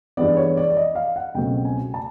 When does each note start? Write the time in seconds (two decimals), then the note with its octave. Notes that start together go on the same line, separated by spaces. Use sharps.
0.17 G2 E3 G#3 B3 D5
0.37 C#5
0.57 D5
0.70 D5
0.77 D#5
0.95 F5
1.16 F#5
1.34 C#2 B2 F#3 A3 C4 G5
1.65 G#5
1.94 A5